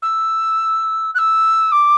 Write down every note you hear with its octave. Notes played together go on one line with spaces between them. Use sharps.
E6
F#6
E6
D6